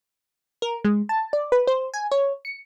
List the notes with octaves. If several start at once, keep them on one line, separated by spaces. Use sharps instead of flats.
A#4
G#3
A5
D5
B4
C5
G#5
C#5
C#7